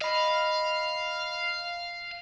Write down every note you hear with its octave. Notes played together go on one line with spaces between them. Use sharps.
D#5 F5 B5